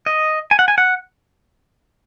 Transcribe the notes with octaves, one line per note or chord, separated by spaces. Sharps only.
D#5
G#5
F#5
G#5
F#5